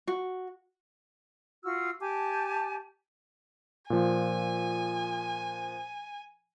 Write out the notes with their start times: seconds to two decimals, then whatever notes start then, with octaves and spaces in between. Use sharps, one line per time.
0.08 F#4
1.63 F4 F#4 E6 F6
1.99 G4 G#5 A5 D6
3.90 A#2 F3 G#5